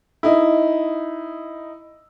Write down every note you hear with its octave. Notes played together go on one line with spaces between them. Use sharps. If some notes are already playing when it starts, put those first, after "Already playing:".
D#4 E4